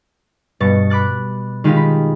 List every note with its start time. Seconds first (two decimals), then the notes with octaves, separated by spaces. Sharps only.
0.60 G2 B2 C#6 A6
0.90 B5 D6 F#6 A6
1.64 D#3 G#3 D#4 F4 G4
1.76 B5